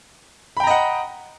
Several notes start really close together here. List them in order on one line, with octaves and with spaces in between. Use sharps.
B5 G5 A#5 D#5 F#5